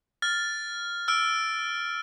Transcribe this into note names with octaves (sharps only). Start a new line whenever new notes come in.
F6 A6
E6 F6 D7